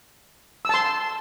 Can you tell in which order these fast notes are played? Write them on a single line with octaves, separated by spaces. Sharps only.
E6 A5 C6